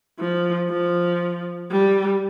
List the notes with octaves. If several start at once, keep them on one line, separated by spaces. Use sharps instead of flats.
F3
F3
G3